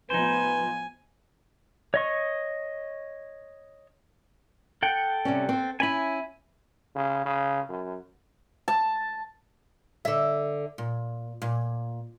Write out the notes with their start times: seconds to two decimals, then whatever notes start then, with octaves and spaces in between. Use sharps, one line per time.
0.10 A2 F3 B3 D#4 B4 C5 G#5
1.94 C#5 D#5 C#6
4.83 A4 F#5 G5
5.25 C3 G3 C#4
5.49 C4 C5
5.80 C#4 E4 G#5 B5
6.95 C#3
7.25 C#3
7.69 F#2
8.68 A5
10.05 D3 E5
10.78 A#2
11.42 A#2